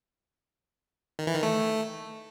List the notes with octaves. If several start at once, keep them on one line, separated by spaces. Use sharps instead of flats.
D#3
E3
D#3
A3